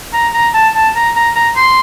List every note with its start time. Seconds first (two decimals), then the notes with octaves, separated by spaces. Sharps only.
0.13 A#5
0.34 A#5
0.54 A5
0.75 A5
0.95 A#5
1.16 A#5
1.35 A#5
1.56 C6